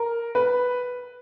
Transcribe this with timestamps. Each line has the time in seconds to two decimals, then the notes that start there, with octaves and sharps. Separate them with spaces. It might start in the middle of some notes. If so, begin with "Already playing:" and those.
Already playing: A#4
0.35 B4